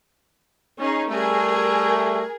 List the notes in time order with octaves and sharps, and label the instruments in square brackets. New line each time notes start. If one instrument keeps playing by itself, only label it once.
[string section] C#4 D#4 G#4
[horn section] G3 A3 [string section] G#4 A#4